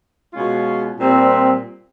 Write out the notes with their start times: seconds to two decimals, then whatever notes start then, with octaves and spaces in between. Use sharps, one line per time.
0.33 B2 G#3 C#4 F4
0.99 A#2 G3 C4